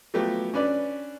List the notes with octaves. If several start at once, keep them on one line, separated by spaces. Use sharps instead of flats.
F3 F#3 A3 B3 G4
C#4 D4 B4 D5